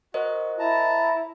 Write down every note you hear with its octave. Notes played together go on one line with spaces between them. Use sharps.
F#4 A#4 C5 D#5
E4 A5 A#5